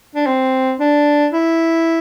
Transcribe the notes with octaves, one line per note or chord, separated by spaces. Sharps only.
D4
C4
D4
E4